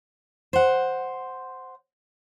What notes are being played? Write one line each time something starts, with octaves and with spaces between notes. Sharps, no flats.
C5 F#5